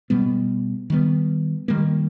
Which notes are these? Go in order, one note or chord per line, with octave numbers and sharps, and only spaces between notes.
B2 G3 B3
D#3 G3 B3
D#3 G3 A#3